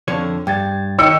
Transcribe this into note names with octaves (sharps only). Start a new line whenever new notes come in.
F2 D3 C#5
G2 G5 G#6 A6
D#3 C#5 G5 E6 C#7